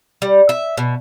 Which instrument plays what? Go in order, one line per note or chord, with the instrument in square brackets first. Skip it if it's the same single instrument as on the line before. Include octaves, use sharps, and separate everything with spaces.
[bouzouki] G3
E5
B2